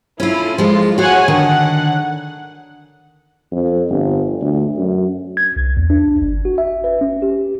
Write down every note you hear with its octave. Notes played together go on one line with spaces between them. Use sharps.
C#4 E4 F4 A4
F3 G#3 F4
F#4 C#5 F5 F#5 G#5
D3 D#3 F#5
F2
G1
D2
F#2
G#6
C2
E2
D4
G1
F#4
E5
B4
C#4
G4